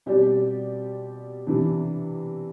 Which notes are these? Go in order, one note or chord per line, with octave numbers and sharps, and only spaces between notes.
B2 G3 C4 G4 D5
C3 E3 B3 D4